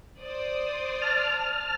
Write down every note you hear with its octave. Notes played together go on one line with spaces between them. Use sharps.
C5 D5 D#6
A5 F6